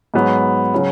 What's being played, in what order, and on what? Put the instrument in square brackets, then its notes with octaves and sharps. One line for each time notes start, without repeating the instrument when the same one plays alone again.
[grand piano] G#2 F#3 B3
C#3 F#3